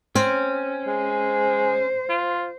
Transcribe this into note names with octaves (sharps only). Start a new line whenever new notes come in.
C4 C#4
G#3 C5
F4